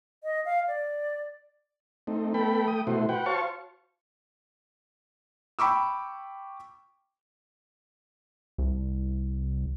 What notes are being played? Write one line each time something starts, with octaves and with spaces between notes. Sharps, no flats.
D#5
F5
D5
A3 C4 D#4
A3 B3 A4 G5 B5
A3 G5 D#6
B2 A3 E4 F#4 C5
F#4 B4 F#5 G5
F#4 C5 C#5 F5 A5 C#6
G5 B5 C#6 D6 E6
C2